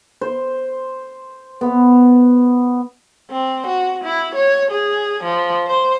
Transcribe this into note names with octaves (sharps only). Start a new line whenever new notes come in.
C5
B3
C4
F#4
E4
C#5
G#4
F3
C5